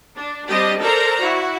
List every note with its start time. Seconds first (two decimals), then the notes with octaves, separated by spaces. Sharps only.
0.16 D4
0.49 G3 C4 D4 G4 D#5
0.81 A4 A#4 C5 D5 A#5
1.19 E4 F#4